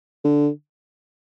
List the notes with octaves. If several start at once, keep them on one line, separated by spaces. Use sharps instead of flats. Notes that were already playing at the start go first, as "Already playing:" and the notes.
D3